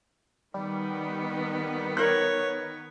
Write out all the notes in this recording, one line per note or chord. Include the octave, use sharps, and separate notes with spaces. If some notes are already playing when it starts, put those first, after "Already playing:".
D#3 G3 B3
A#4 C#5 F#6